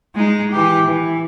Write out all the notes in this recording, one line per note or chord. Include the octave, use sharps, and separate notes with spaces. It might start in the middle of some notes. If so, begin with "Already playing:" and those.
G#3 D#4
E3 G4
E3